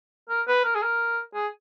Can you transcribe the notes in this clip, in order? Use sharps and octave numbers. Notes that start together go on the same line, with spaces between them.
A#4
B4
A#4
G#4
A#4
G#4